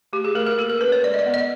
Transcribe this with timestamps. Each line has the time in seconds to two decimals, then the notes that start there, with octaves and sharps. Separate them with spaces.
0.13 A3 G4
0.24 G#4
0.35 A3 A#4
0.46 A#4
0.58 A#3 A4
0.70 A#4
0.81 C#4 B4
0.92 C#5
1.04 G#3 D5
1.14 D#5
1.19 D5
1.26 B3
1.34 D#5